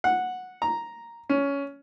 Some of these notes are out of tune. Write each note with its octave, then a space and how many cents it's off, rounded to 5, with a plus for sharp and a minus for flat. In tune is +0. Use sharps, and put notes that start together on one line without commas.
F#5 -10
A#5 +0
C#4 +15